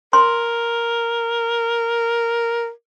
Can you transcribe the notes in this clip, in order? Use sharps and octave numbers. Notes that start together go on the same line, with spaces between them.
A#4 C6